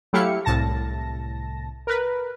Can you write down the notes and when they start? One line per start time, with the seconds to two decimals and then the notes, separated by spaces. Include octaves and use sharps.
0.13 F#3 A3 E4 G4 F5 C#7
0.45 C2 A2 A5 A#6
1.87 A#4 B4